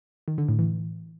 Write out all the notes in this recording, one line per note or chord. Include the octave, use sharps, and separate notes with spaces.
D#3
D3
A2
E3